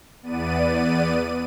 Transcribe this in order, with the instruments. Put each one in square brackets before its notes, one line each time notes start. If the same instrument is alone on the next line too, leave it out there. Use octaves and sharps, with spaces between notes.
[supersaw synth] E2 B3 D5 D#7